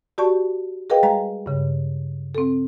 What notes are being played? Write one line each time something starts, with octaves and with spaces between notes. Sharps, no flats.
F#4 G4 D5 A5 C#6
G#4 A#4 B4 D#5 F5 G5
G3 G#3 F5 A#5
G2 C#3
C4 A4